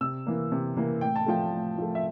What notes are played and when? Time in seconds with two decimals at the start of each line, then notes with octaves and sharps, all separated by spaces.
0.01 C3 E6
0.27 E3 A#3
0.52 C3
0.77 E3 A#3
1.01 A2 G5
1.16 A5
1.27 F3 A3 G5
1.53 A2
1.78 F3 A3
1.95 E5